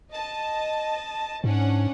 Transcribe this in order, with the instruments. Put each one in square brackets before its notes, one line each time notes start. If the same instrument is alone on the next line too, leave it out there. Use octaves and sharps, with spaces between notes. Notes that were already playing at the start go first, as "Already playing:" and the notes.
[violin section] D#5 A5
[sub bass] G#2 [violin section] C#4 D4 F#5